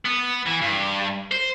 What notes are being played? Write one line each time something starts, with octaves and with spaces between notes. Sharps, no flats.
B3
E3
G2
C5